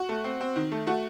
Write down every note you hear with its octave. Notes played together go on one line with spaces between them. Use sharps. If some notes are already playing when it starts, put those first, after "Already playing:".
Already playing: F#4
A3
C4
C4
D#3
A3
A3 F#4